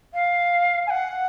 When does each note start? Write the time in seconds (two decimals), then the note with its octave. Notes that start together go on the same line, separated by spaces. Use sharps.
0.13 F5
0.87 G#5
0.90 F#5